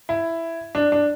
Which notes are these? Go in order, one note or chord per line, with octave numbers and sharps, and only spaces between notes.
E4
D4
D4